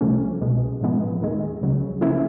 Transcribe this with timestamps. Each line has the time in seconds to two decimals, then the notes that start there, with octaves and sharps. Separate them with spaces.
0.01 C2 C3 F3 A3 C#4
0.41 C2 B2 G#3
0.81 A2 F3 G#3 B3
1.21 D#2 D#3 G#3
1.61 C#2 C#3 F#3
2.01 C#3 F3 A#3 C#4 E4